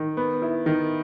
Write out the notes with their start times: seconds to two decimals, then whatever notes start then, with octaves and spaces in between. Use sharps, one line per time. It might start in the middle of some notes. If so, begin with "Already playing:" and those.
Already playing: D#3
0.17 B3
0.42 E4
0.66 D#3